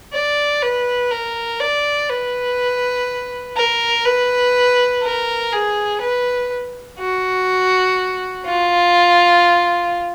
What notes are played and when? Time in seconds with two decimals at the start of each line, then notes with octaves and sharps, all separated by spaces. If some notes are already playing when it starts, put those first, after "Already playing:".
0.13 D5
0.62 B4
1.11 A#4
1.60 D5
2.10 B4
3.56 A#4
4.05 B4
5.03 A#4
5.52 G#4
6.01 B4
6.99 F#4
8.46 F4